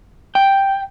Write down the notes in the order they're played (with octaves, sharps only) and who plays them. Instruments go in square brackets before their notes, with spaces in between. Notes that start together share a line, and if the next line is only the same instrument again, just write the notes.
[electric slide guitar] G5